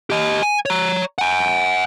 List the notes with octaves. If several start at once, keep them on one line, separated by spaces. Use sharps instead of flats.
G4 D#5
G#5
C#5 A#5
F#5 G#5